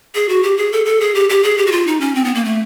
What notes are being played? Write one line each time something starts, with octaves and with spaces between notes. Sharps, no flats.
G#4
F#4
G4
G#4
A4
A4
G#4
G4
G4
G#4
G4
F#4
F4
D#4
C#4
C4
B3
A#3
A3